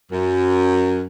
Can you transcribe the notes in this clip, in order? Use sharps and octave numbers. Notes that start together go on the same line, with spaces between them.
F#2